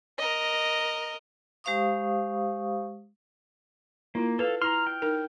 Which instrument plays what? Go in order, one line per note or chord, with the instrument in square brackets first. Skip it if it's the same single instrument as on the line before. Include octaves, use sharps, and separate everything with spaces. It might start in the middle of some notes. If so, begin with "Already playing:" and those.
[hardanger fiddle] A#4 D#5
[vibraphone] G#3 G4 C5 F5 C#6 D#6
[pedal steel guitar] A#3 [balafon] E4 F4
[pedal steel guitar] A4 F5 [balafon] B4
[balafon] E4 [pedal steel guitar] A#5 C6 [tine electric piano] F6
[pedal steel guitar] G5
[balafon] D#4 A#4